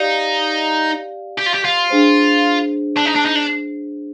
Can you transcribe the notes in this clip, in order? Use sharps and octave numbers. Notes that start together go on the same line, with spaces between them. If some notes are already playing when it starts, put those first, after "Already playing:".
Already playing: D#4 G4 D5 F5
G4
F4
G4
F4
D4 G#4 C5
D4
D#4
D4
D#4
D4